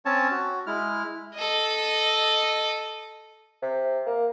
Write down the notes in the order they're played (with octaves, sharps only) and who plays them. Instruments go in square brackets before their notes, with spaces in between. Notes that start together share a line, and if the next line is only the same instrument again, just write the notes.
[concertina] C4 C#4 C#5 A5
F#4
G#3 E4 F6
[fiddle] A4 D#5
[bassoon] C3
A#3